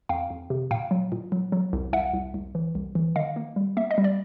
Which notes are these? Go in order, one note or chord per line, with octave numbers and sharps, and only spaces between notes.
F2 F5 G5
F2
C3
A#2 F5 G5
F#3
A#2
F#3
F#3
C2
C2 E5 F#5
C2
C2
E3
C2
E3
D#3 D#5 F5
A#3
G3
A#3 E5
D#5
G3
D5